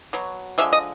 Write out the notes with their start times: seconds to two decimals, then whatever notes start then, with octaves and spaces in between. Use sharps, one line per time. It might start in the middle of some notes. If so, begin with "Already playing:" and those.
0.13 B2 F#3
0.58 D3 F3 G#3 E5
0.73 D#5